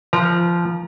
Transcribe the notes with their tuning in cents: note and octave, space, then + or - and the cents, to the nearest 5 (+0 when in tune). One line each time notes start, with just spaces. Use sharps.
F3 -15 B4 -45 A#5 +0